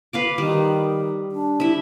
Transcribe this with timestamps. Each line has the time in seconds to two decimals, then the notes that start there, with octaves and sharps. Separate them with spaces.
0.13 B4 F5 D6
0.38 D#3 G3
1.32 D4
1.60 E4 E5